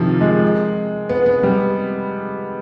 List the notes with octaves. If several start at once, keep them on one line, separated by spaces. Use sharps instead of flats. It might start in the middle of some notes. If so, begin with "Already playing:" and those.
Already playing: C3 D#3 F3
G#3
B3
B3
G3